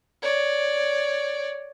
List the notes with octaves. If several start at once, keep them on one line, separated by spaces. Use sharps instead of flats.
C#5 D5